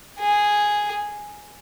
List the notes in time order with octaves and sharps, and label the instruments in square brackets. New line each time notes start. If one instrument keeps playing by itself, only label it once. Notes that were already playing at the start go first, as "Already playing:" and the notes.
[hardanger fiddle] G#4